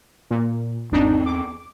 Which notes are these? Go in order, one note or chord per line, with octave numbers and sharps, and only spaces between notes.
A#2
G#1 E2 C4 D4 D#4
D6